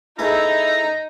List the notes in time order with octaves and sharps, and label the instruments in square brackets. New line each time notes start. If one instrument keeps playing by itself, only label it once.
[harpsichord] A3 G#4 B4 [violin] D#4 [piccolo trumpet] E4 [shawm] A#5